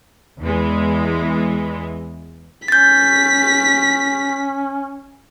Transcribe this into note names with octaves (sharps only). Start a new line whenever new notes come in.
E2 E3 G#3
C#4 G6 A6 B6